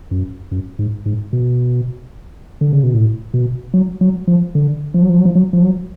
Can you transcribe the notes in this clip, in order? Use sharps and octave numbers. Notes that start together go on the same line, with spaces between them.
F#2
F#2
G#2
G#2
B2
D3
C#3
B2
A2
B2
F#3
F#3
F3
D3
F3
F#3
F3
F#3
F3
F#3
F3
F#3